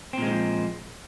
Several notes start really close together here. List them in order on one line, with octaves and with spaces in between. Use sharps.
C4 A#2 G#3 D#3 F3